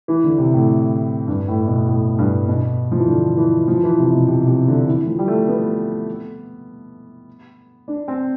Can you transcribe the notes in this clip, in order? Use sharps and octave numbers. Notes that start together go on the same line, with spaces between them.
E3
D3
C3
A2
G2
A2
B2
A2
G2
B2
F3
E3
D3
E3
F3
E3
C3
B2
C3
C3
D3
E3
F3
G3
A3
B3
D4
C4